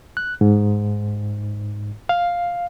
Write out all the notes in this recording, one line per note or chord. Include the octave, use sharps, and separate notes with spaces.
F#6
G#2
F5